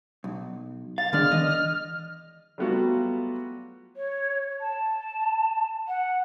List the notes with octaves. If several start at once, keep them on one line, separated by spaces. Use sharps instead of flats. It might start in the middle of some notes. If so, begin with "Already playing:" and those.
B1
F5 A6
B2 D#3 G#3 D4 F6
E3 D#5
F#3 G3 A3 B3 F4 F#4
C#5
A5
F#5